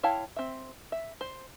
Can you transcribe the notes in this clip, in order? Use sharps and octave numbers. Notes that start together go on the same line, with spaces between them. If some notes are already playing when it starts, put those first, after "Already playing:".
E4 C#5 F5 G5 A5
C4 E5
E5
C5